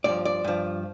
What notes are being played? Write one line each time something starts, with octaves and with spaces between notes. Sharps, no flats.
G2 F3 D5
D5
G2 F3